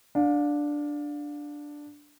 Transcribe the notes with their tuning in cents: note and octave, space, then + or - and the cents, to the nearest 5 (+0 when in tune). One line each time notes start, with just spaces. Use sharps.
D4 +0 F5 +35